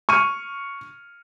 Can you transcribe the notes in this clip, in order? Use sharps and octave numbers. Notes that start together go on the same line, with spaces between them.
C#6 F6 D#7